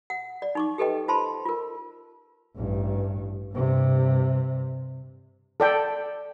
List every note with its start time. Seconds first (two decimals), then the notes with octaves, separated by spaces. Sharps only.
0.10 F#5
0.42 D5
0.55 D#4 C#6 D6
0.78 G4 A4 B4 D#5 G5
1.08 F4 C5 A5 B5 C6
1.46 F4 A#4
2.57 A1 G2
3.54 G2 C3
5.60 A4 D5 G5